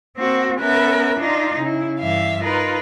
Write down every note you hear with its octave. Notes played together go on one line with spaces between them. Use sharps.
A#3 C4 F#4
B3 C#4 A#4 B4 E5 B5
D4 D#4 F4
C#3 E4
G2 E3 E5 F5
D#4 F4 A#4 B4